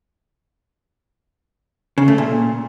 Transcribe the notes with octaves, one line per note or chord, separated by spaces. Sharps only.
C#3
A3
A#2